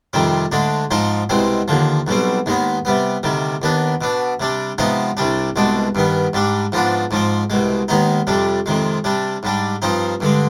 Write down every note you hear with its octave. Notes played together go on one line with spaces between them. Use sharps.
F2 C3 D#3 G3 C4
D2 D3 G#3 D4
G#2 F3 C4 D#4
C2 B2 G#3 C4
D#2 D3 F3
B1 B2 G3 C4
D#2 D#3 G#3 B3
C3 G3 B3
D2 C3 D#3 G3
D#2 D#3 B3 D4
B2 B3 D4
C3 G3 D4
C3 F3 G#3 B3 D#4
C2 C3 G3 D4
C2 B2 G#3 D4
G2 D#3 B3
G#2 G3 D4
G#2 F3 B3 D4
G#2 F3 C4
C2 B2 G#3
D#2 D#3 G#3 B3 D#4
F2 C3 G3 D4
F2 C3 D#3 G#3
C3 G3 D4
G#2 G3 D4
G2 F3 C4 D#4
G2 D3 G#3